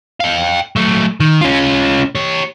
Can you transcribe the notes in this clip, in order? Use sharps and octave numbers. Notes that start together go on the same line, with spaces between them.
F5 G5
F#3 A3
D#3
C#4 F4
G4 C#5